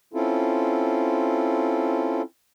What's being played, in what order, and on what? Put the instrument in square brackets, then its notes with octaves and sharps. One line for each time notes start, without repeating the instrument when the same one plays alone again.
[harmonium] C4 C#4 E4 F4 A4